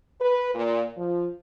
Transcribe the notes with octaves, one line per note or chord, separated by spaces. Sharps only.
B4
A#2
F3